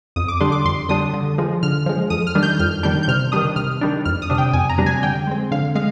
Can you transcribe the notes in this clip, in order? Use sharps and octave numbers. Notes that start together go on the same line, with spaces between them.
F2 D#6
D6
D3 G3 D4 C6
D6
F2 C6
D3 G3 D4 D#6
D3
F3 G#3
D3 F6
F3 G#3
F2 D#6
F6
D#3 G3 D4
G6
F2 F6
D#3 G3 D4 G6
G6
C3 F6
D#3 G3 D4 D#6
C3 F6
D#3 G3 D4
F2 F6
D#6
C3 G3 D4
G5
F2 G#5
A#5
C3 G3 D4
G#5
D3 G5
G#3 C4
D3 F5
G#3 F5